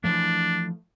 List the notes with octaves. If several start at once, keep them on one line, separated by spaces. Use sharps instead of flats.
E3 F3 A3 D4